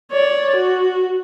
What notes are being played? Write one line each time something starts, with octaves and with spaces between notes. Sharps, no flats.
C#5 D5
F#4